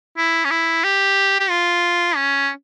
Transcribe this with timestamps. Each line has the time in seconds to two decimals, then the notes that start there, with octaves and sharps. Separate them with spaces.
0.17 E4
0.45 C#4
0.51 E4
0.84 G4
1.40 G4
1.50 F4
2.16 C#4